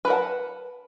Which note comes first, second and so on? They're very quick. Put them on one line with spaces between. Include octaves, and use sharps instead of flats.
B4 A#4 F#5 A5